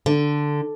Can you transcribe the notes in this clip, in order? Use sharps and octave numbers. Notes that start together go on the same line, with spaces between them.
D3